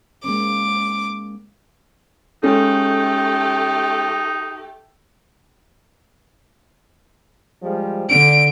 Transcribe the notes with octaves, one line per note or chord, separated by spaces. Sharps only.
G#3 A#3 C#4 D6
G#3 A3 C#4 D#4 G4 A4
F3 G3 G#3
D3 D4 D7